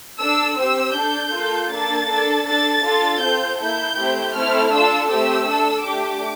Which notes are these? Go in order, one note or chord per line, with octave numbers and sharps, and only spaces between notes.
D4 A4 E6
C4 G4 E6
D4 A4 G6
A#3 F4 A4
A#3 D4 A4 A6
D4 A4
D4 A4 A6
D4 F4 A4
C4 F4 A4 G6
A#3 E4 A4 G6
A3 C4 E4 G4
A3 C4 E4 A4 F6
D4 F4 A4 E6
A3 C4 G4 E6
D4 A4
A3 D4 G4 D6